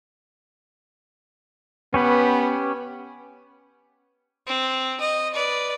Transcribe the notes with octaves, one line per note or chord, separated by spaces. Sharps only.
B3 C#4 G4 B4
C4
D#5
B4 D5